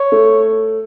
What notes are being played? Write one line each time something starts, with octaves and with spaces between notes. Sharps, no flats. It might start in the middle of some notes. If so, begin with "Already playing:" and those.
Already playing: C#5
A3